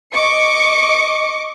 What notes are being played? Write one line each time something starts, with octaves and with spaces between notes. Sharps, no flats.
D#5 C#6 D6 C#7